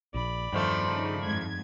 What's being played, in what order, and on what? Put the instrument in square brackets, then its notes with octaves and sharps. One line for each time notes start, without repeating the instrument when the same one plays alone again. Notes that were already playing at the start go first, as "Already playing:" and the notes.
[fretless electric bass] A#1 [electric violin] D5 B5
[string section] E2 [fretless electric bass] G2 [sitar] D#3 F3 A3
[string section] C#3 D#4
F2 G#2 G#6